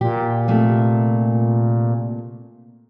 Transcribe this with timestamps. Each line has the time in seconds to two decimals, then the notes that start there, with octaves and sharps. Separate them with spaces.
0.01 A#2 G4
0.48 C3 A3 A#3